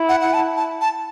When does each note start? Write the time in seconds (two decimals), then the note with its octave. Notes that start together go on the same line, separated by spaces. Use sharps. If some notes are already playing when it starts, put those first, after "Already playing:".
Already playing: E4
0.09 F#5
0.21 F#5
0.34 A5
0.57 A5
0.81 A5